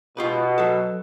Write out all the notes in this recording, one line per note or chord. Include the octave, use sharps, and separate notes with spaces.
B2 F4 G4 B4
F#3 A4